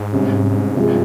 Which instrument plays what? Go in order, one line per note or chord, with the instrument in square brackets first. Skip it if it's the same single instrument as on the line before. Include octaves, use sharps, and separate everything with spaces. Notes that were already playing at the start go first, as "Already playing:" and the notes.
Already playing: [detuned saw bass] G#2
[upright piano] C3 G3 C#4
[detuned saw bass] G2 [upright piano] C3 F3 G#3